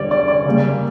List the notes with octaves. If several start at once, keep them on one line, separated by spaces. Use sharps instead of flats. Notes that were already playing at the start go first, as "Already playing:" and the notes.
Already playing: E2 D3 G3 C#5 D5
D5
D5
C#3 G3 A#3